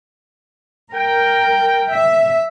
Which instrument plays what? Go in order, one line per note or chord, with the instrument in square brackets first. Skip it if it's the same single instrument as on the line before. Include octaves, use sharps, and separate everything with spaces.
[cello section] A#4 [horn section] G5
[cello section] E5